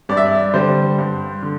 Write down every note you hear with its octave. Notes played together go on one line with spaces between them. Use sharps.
G2 D5
E5
D5
D3 G3 C5
G2
D3